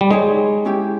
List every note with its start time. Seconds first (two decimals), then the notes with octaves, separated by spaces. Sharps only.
0.01 G3
0.11 G#3 D#4 G#4 C#5
0.65 C#4 E4 G4